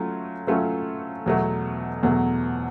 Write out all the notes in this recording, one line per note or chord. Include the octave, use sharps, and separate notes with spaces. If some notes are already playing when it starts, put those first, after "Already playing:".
Already playing: F#3 A3 C#4 F4
F#3 A3 C#4 F4 A4
E2 B2 F#3 A3
E2 B2 F#3 A3